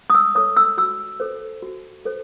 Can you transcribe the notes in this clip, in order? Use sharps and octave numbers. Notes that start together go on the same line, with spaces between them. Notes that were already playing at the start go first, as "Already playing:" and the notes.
D#6
E6
A4 C#5 D#6
E6
F#4 E6
A4 C5
F#4
A4 C5